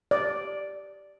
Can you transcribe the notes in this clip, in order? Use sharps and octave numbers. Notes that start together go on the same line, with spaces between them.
D5